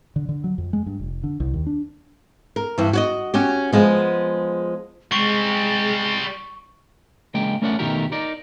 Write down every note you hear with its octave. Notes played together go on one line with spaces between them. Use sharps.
D3
D3
F#3
F2
G#3
G2
F1
D3
C2
D#2
D4
A#4
G2 E3
F#4 C#5 D#5
C#4 F#4 G4
F3 G#3 B3
G3 G#3 C4 C#6
C#3 G#3 A#3 G5
A3 C#4 A#4 C#5 D5 F#5
B2 D#3 A3 F#4 G4 A#4
D#4 A#4 D5